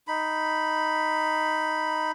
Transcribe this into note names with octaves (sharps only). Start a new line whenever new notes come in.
D#4 B5